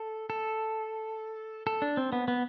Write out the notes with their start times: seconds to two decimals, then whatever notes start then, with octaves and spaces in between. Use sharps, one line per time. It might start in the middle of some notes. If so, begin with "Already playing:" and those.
Already playing: A4
0.30 A4
1.67 A4
1.82 D4
1.97 C4
2.13 B3
2.28 B3